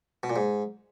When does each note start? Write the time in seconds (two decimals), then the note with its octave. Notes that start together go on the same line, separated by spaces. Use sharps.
0.23 B2
0.30 A#2
0.36 G#2